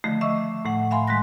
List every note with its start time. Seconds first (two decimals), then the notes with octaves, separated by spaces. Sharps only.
0.04 D3 D#3 F3 A3
0.21 D#5 E5 C#6 D6 E6
0.65 A2 A3 F#5
0.91 E5 F5 G#5 B5 C6
1.08 D#3 G#3 C6 F#6 A#6